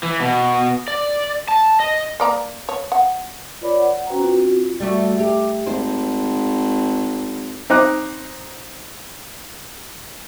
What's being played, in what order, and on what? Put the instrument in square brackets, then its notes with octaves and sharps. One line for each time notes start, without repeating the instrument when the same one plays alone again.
[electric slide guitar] E3
B2
D5
A5
D#5
[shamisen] A#3 D5 A#5
C#5
F#5
[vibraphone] F4 B4 C#5 D5 B5 D6
F#5
C#4 F#4 B4 C5 G5 A#5
C4 D4 F4 F#4
F4
[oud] G3 A3 F#4
G4
[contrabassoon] G#1 [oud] C5
[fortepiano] C4 D#4 D6 F#6